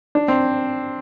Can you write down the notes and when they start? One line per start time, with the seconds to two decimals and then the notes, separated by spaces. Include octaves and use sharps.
0.15 D4
0.28 C4